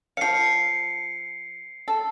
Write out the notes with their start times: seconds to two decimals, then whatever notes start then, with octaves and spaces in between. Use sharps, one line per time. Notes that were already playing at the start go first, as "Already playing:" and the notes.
0.17 F3 F5 C7 C#7
1.88 A4